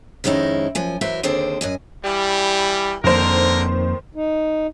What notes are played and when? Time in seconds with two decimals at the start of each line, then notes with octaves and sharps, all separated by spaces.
0.24 F2 D#3 G#3 C#4 D#4 E4
0.75 F#2 F3 G#5
1.01 E3 F#3 A#4 C5 E5
1.23 D#2 D3 C4 D4 G#4 C5
1.61 F#2 D#5 G#5
2.05 E3 G3
3.04 F2 D3 D#3 A#3 A#4 C5
4.15 D#4